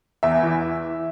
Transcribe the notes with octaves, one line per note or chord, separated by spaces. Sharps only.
E2 E5
E3